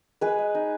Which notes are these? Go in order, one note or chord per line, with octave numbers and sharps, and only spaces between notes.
G#3 G#4 B4
G#3
D#4